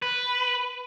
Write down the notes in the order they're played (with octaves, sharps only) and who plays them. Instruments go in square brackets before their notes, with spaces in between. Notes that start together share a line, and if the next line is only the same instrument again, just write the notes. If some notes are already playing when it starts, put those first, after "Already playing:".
[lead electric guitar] B4